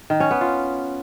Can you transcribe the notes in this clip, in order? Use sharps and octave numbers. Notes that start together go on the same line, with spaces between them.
D#3
C#4
B3
F4